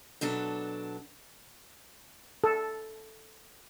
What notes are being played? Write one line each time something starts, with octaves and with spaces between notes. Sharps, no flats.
B2 F#3 D4 A4
A4